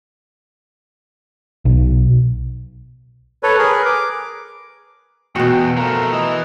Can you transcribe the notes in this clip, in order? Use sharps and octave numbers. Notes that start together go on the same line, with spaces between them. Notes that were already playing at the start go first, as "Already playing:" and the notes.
B1
A4 B4 C#5
G#4 A#4 B4
D6
E2 B2 F#4 G5
F3 A3 A#4
E3 D#5